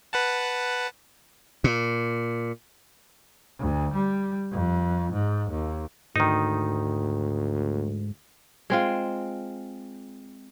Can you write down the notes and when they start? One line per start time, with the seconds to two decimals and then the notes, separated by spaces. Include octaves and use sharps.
0.13 B4 F#5 A5
1.64 A#2
3.59 D2
3.94 G3
4.52 F2
5.13 G#2
5.50 D#2
6.16 D2 G#2 D#3 D#4
8.70 G#3 C4 F4